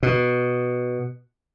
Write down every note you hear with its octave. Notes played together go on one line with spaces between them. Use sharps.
B2